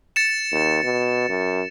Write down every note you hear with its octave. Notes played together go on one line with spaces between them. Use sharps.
A6 C#7 E7
D#2
B2
F#2